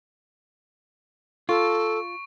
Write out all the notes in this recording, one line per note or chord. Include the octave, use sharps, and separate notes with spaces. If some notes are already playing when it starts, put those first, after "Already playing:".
F4 A4 C#6